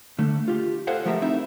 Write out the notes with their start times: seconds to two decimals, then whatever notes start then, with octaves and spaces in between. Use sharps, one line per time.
0.19 D3 A3
0.48 F4 G4
0.87 A4 C5 F5 F#5 G#5
1.06 F3 A3 G4 A#4 C5 E5
1.22 C4 D#4 E4 E5